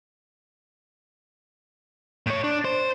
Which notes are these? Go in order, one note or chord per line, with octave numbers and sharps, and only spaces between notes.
A2 C#5
D4
C5